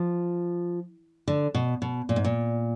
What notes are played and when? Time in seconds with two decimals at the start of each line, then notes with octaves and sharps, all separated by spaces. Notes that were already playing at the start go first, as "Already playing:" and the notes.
Already playing: F3
1.28 D3
1.55 B2
1.82 B2
2.09 A#2
2.16 G#2
2.25 A#2